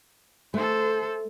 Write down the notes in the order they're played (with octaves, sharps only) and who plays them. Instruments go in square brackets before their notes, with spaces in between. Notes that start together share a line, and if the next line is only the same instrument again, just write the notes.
[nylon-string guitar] A3 [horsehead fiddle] A4 C5